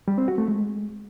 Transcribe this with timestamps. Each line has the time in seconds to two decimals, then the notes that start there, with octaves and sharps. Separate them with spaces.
0.08 G3
0.18 C4
0.28 F#4
0.38 A3
0.48 G#3